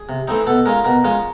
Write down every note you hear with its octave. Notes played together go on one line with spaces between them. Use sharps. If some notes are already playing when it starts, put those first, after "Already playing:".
Already playing: G#4
C3
E3 A3 C4 D#4
B2 A4
G#3 C#4 F4 A#4
B2 A#4
G#3 C#4 F4